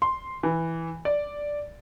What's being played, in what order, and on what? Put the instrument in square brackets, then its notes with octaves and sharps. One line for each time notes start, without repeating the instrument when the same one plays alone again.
[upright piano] C6
E3
D5